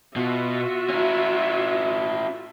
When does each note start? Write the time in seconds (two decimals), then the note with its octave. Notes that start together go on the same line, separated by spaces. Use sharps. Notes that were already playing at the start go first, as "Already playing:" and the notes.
0.16 B2 F4 F#4 E5
0.90 C#4 E4